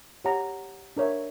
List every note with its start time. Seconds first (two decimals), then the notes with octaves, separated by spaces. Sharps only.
0.25 G4 C#5 F#5 A#5
0.97 D4 A#4 C#5 E5